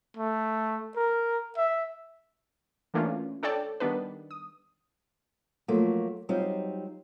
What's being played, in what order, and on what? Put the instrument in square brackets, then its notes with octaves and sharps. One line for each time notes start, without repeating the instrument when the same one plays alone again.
[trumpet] A3
A#4
E5
[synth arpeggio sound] E3 A3 A#3 C#4 D4 F4
D4 A4 C#5 D5 G5 A5
D#3 G3 B3 D4 B4
D#6
[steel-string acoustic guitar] F3 F#3 A3 A#3
F#3 G3 C4 D#4 F4